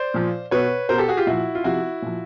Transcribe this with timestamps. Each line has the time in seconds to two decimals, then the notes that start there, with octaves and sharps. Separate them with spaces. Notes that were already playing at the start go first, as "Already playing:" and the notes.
Already playing: C5 D5
0.14 A#2 F3
0.51 B2 B4 C#5
0.89 B2 A#4 C5
0.98 G4 A4
1.08 F#4 G#4
1.17 F4 G4
1.27 A#2 F3 E4 F#4
1.55 F4
1.64 C3 F3 E4 F#4
2.02 A#2 F3